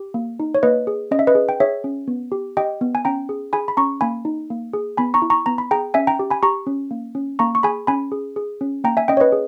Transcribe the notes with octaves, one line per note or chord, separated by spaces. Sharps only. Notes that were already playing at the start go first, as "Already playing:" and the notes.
Already playing: G4
A#3
D#4
C#5
A#3 B4 D#5
G#4
C#4 D#5
E5
B4 D#5
G#4
G5
G#4 C#5 E5
C#4
B3
G4
G4 D#5 G5
B3
G#5
C#4 G5 A#5
G#4
G#4 G#5 B5
B5
C#4 A#5 C#6
A#3 G#5 B5
D#4
A#3
G#4
B3 G#5 B5
A#5 C#6
E4
A#5 C#6
B3 A#5
B5
G#4 G5 A#5
C#4 E5 G#5
G5 A#5
G4
G#5 B5
G4 A#5 C#6
C#4
A#3
C#4
A#3 A#5 C#6
C#6
G#4 G#5 B5
C#4 G#5 B5
G#4
G#4
C#4
A#3 G5 A#5
E5 G#5
C#4 D#5 G5
C#5
B4 D#5
G#4